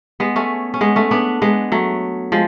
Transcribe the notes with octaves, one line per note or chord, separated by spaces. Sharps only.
G#3 B3
A3 C#4
C#4
G#3 B3
A3 C#4
B3 D4
G#3 B3
F#3 A3
F3 G#3